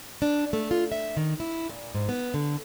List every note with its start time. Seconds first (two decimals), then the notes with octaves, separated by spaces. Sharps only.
0.22 D4
0.53 A3
0.71 F4
0.92 E5
1.17 D#3
1.40 E4
1.69 A#2
1.95 G#2
2.09 B3
2.34 D3